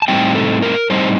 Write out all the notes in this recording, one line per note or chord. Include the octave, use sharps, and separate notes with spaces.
A5
A2 G3 C4 D#4 G5
A4
A#4
A2 G3 C4 D#4 C5